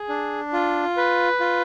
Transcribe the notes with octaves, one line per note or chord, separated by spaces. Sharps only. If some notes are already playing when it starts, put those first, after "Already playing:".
Already playing: G#4
D4
F4
B4
F4